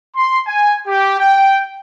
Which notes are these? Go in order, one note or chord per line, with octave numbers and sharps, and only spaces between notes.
C6
G#5
G4
G5